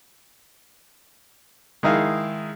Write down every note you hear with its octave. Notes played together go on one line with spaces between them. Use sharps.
D#3 G#3 D#4 E4 G#4 F5